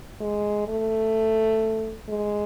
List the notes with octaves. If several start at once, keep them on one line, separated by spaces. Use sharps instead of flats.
G#3
A3
G#3